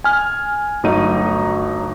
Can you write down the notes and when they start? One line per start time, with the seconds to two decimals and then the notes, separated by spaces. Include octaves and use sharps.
0.04 G#5 F6
0.83 G1 F#3 A3 D#4 D#7